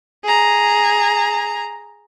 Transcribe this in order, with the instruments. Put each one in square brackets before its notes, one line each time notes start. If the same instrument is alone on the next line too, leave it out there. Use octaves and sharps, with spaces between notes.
[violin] G#4 A#5